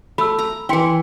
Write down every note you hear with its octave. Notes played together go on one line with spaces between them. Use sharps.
A3 B5 E6
A#5
E3 E4 G5 C6 C#7